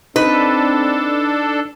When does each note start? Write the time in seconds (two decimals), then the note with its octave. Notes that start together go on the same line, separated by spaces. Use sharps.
0.16 C4 D4 D#4 A4 B4